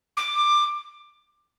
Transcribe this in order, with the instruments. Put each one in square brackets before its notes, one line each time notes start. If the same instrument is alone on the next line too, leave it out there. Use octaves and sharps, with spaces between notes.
[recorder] D6